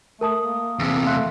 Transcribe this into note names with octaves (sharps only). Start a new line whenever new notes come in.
A3 A#4 A5 D#6
A#3
E2 C3
A3 F5 C6 F#6